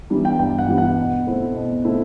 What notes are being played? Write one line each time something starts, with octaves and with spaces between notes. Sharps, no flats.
E3 G3 B3 D4
G5
G2 G5
F#5
E3 G3 B3 D4
F#5
B2
A3 C4 E4
B2
A3 C4 E4